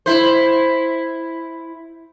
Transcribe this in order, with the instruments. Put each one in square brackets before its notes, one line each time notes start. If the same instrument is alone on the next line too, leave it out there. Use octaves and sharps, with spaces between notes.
[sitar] E4 C5